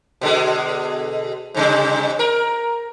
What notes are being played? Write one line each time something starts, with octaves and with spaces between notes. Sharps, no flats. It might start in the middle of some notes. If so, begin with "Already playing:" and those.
B2 D3 G#3
G#2 C3 G3
A#4